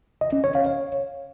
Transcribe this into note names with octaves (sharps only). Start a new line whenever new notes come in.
D#5
C#4
C#5
F5
C#5